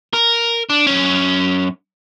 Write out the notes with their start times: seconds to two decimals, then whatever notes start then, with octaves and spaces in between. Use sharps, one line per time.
0.13 A#4
0.70 D4
0.87 F#2 C#4